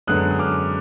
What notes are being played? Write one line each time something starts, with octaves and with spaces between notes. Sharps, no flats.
F#2 D3 G#3 B3 D#6 F#6
D#6
D6 F6